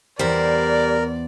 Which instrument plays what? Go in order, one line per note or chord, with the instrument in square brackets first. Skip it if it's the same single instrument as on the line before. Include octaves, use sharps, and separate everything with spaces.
[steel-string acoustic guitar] E2 C5 [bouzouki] G3 [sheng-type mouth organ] A#4 [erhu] D5